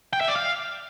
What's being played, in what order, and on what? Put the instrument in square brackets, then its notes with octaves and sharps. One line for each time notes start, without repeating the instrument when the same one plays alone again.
[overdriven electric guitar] G5
E5
D5
F5